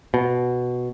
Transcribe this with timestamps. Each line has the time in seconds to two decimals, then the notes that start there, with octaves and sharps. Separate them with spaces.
0.14 B2